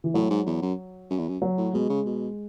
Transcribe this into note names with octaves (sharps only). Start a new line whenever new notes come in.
E3
A2 F#3
G#2
E2
F#2
F#2
E2
F#2
F#3
A2
B2 G#3
C#3
B2